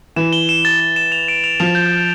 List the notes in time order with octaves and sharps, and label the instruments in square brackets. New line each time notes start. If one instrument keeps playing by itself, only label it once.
[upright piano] E3 [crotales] E7
[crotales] G7
E7
A6
A6
E7
F7
D7
F7
[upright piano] F3 [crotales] F7
[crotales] G6
G6